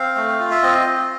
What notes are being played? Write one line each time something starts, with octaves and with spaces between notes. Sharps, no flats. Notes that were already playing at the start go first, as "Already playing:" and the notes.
Already playing: C4 F5
A3
F4
E5
C4 D#5
F4